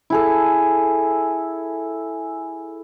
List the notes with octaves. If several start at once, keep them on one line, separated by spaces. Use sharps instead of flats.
E4 G#4 A4